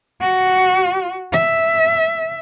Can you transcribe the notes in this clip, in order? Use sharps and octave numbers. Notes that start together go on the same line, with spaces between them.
F#4
E5